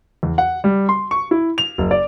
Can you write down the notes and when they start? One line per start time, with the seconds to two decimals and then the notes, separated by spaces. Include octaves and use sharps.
0.23 E2
0.38 F#5
0.64 G3
0.89 C6
1.11 C#6
1.31 E4
1.58 F7
1.78 F#1
1.91 D5